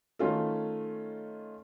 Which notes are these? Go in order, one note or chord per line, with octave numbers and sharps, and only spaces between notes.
D#3 A3 C#4 F4 A4